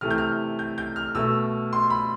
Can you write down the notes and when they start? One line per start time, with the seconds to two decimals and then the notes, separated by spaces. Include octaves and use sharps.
0.01 C3 E3 A3 F6
0.11 G6
0.18 F6
0.59 G6
0.78 G6
0.96 F6
1.15 B2 A3 E6
1.73 C6
1.90 B5